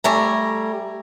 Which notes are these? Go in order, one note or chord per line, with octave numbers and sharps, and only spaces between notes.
G3 A3 G#5 A#5